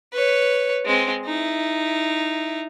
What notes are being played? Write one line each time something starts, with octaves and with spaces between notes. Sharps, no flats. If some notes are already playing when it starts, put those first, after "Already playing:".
B4 C#5
G#3 C4
D#4 E4